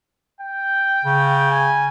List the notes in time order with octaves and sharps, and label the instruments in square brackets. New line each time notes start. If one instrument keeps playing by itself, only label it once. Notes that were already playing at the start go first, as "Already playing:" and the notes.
[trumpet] G5
[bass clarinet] C#3
[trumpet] G#5